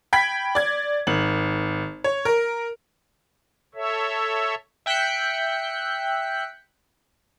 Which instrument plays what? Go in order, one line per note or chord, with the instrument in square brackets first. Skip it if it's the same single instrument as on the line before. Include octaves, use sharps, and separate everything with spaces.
[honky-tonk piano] G5 B5 G#6 B6
D5 G#6
G#1 F#7
C#5
A#4
[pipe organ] A4 C#5 E5
[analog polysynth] E5 G5 F#6 G6 B6 C#7